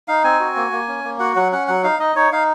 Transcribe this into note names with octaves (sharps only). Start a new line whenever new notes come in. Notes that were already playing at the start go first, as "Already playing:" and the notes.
D#4 F5
C4 G#5
F#4
A#3
A#3
C#4
A#3
F#4 F#5
F#3 F#5
C#4 F#5
F#3 F#5
D#4 F5
D#4 D#5
D#4 C#5
D#4 F5